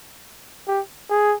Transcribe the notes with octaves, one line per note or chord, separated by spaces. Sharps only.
G4
G#4